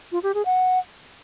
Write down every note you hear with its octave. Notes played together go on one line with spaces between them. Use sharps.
F4
G4
G#4
F#5